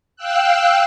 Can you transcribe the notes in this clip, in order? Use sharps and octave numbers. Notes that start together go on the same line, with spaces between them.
F5 G5 E6 F#6